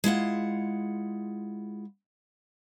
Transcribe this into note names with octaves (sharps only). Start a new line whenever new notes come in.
G#3 E4 F4 F#5